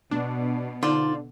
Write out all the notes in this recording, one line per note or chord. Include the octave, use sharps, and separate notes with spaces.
B2 D4
D3 D#4 F4 C5 D5